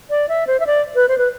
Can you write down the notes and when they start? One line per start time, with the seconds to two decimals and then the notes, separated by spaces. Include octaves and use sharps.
0.10 D5
0.29 E5
0.47 C5
0.60 E5
0.67 D5
0.95 B4
1.09 C5
1.18 B4